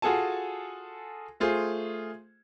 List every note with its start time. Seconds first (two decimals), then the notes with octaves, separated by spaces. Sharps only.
0.02 F4 F#4 G#4 A4 G#5 A5
1.40 A3 F4 G#4 C5